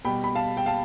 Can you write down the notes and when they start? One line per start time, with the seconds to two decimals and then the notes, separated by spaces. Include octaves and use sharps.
0.05 B2 G3 G5 B5
0.24 B5
0.35 F5 A5
0.57 G5
0.66 F5 A5